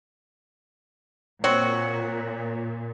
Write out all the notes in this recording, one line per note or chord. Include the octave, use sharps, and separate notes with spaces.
A#2 C4 F#4 C#5